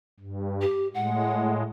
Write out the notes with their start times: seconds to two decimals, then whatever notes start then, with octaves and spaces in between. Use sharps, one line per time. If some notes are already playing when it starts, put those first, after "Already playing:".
0.20 G2
0.61 G4
0.94 A2 G#3 F#5